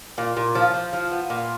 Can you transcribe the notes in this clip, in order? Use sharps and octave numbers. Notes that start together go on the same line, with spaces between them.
A#2
A#2
F3
F3
F3
B3
A#2